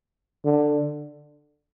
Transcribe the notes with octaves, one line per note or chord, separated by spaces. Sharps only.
D3